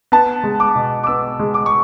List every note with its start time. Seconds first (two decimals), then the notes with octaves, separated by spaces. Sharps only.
0.12 B3 A5
0.44 G#3
0.60 D6
0.75 B2
1.04 D6
1.07 B3 E6
1.39 G#3
1.54 D6
1.66 C#6